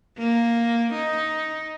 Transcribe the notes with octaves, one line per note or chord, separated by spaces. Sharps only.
A#3
D#4